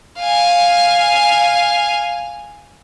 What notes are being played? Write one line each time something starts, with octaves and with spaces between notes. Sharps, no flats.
F5 G#5